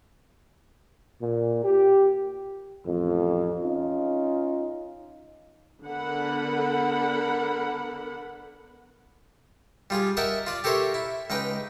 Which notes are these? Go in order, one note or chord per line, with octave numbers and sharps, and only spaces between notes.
A#2
G4
A1 F2
C#4 D#4 F4
D3 B3 A4 A#4 F#5 B5
G3 F4 G#4
A#4 D#5 E5 F#5 G5 A5
F4 D5
G4 A4 A#4 C5 C#5 E5
E4
C#2 D#4 B4 G5